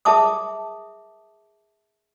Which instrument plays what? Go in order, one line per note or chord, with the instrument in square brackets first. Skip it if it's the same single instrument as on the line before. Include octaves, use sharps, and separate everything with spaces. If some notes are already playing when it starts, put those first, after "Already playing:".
[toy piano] G#4 A#4 E5 A5 D6 D#6